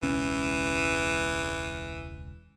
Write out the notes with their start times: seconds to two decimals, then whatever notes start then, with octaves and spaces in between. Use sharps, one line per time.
0.03 E1 C#2 E3 C#4